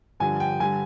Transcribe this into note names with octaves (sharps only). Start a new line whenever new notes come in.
G2 D3 F3 G#5
G5
G2 D3 G3 G#5